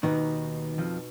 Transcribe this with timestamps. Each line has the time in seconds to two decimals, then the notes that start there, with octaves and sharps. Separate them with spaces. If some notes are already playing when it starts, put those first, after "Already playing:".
0.03 D#2 B2 D#3 B3 D#4
0.78 F2 F3